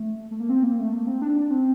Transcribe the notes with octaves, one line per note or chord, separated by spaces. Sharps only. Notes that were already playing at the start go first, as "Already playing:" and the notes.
Already playing: A3
A3
A#3
C4
A#3
A3
A#3
C4
D4
D4
C4